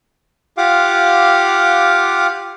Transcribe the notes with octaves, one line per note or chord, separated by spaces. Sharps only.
F4 G4 F5 F#5 D6